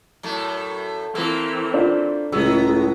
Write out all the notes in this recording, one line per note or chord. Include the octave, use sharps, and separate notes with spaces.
F#2 A2 A3
E3 A3 A#3 C4
D4 F4 C5
C#2 A2 F#3 G#3 B3 E6